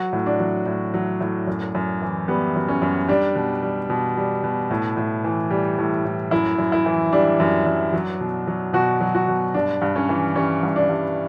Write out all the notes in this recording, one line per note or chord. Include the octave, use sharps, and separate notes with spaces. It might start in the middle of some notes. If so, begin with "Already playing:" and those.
Already playing: F#3 F#4
A2
D4
F#3
A2
F#3
A2
F#2
F#2
E3
G3 B3
F#2
C#4
F#2
G3 D4
B2
G3
B2
G3
B2
A2
A2
E3
G3
A2
A2
F#2 E4
F#2
E4
E3
G3 D4
F#2
F#2
F#3
B2
F#3
B2 F#4
F#3
F#4
B2
G2 D4
G2
C#4
E3
G3 C#4
G2
D4
G2